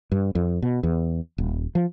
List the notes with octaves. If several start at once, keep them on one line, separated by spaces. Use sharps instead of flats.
G2
F2
B2
E2
D#1
F3